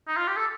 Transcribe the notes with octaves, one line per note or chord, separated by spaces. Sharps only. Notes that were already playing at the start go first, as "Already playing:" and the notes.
D#4
F4
G4
A4